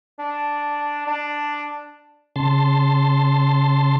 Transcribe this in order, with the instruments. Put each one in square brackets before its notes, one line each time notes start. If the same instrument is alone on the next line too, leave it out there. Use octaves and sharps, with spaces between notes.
[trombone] D4
D4
[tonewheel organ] C#3 A5 C6